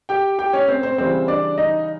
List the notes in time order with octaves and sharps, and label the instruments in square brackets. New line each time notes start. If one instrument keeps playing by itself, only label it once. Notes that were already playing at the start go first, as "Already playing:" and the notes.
[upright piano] G4 G5
G4 G5
C#4 C#5
C4 C5
C4 C5
C#3 E3 G3 C4 C5
D4 D5
D#4 D#5